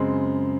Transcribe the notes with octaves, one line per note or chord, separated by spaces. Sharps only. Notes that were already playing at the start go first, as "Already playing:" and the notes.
Already playing: F#2 C#3 G#3 C4